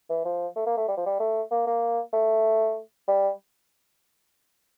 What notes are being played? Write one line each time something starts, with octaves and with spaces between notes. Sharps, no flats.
E3
F3
A3
A#3
A3
G3
F3
G3
A3
A#3
A#3
A3
G3